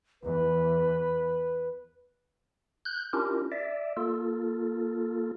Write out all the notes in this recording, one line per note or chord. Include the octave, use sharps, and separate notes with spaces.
E2 E3 B4
F#6 G6
C#4 D4 E4 F4 G4 A#4
D5 E5
A#3 F4 A4